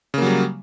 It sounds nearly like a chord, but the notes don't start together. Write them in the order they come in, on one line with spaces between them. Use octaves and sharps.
C#3 A#3 F#3 G3